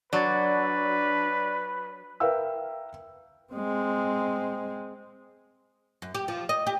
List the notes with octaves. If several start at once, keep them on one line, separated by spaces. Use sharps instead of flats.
F#3 D4 B4 D5 C#6 A6
A#4 B4 E5 F5 G5 E6
G#3 C4
F#2
G4
F3
D#5
G4